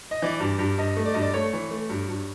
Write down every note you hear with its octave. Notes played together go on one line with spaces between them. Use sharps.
D#5
E3 D5
G2
G2
G2 D#5
A3
D5
G2 D#5
D5
A3 C#5
E3
A3
G2
G2